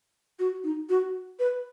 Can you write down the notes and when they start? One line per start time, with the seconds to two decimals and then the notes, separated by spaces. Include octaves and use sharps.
0.39 F#4
0.64 D#4
0.89 F#4
1.39 B4